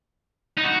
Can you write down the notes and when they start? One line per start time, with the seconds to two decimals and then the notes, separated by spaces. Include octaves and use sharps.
0.58 D#4
0.64 F#4